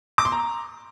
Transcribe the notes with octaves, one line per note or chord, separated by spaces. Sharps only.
D6
C6
A#5